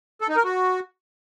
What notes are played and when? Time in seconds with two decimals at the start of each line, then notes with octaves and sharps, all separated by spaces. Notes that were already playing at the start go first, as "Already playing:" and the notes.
0.21 A4
0.29 D#4
0.36 A#4
0.44 F#4